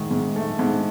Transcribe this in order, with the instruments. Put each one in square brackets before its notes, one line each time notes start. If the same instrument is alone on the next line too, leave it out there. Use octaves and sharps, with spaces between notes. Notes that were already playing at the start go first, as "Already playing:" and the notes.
Already playing: [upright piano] G#2 D#3 A3
G#2
A3
G#2